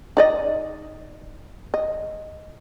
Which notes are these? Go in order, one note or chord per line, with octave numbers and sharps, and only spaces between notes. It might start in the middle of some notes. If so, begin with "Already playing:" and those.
D#4 D5 D#5
D#5